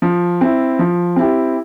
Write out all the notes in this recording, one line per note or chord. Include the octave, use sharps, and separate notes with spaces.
F3
C4 E4
F3
C4 E4 G4